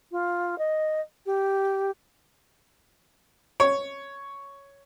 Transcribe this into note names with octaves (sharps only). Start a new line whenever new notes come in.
F4
D#5
G4
C#5